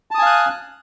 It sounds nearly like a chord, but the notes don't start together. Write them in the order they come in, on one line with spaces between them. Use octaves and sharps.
A5 D#6 G#5 F5 F#6